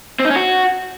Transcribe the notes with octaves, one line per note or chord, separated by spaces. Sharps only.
C4
D#4
C#4
F#4